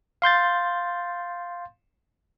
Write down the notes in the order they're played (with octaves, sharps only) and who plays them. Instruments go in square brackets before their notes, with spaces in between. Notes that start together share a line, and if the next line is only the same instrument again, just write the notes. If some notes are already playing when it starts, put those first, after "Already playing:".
[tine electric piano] F5 C6 G6 A6